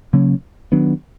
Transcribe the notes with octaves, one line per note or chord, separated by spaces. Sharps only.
C#3 F#3 A#3 C#4
D#3 F#3 B3 D4